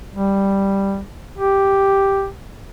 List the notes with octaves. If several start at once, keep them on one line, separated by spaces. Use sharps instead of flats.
G3
G4